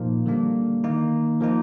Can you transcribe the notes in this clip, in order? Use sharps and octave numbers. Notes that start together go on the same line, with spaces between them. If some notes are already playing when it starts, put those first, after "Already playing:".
Already playing: A#2 F3 A#3 D#4
D3 G3 A#3 D4
D#3 A#3 D#4
F3 A#3 D#4